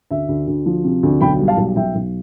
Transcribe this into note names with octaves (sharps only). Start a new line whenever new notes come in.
D2 E5
D2
D2
F3
C3
D2
B1 G5 B5
G3
F5 A5
B1
B1 E5 G5
B1